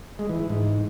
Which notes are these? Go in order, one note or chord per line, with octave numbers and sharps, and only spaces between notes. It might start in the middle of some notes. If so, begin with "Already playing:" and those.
G#3
E3
E3
G#2